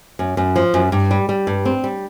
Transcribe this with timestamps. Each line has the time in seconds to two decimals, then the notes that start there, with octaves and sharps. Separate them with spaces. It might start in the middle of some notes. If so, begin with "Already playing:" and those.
0.19 F#2
0.37 F#2
0.56 F3
0.74 F#2
0.92 G2
1.11 G3
1.29 G3
1.47 G2
1.65 C4
1.84 G3